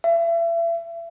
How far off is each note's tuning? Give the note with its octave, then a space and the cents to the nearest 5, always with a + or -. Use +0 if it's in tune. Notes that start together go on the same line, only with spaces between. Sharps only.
E5 +35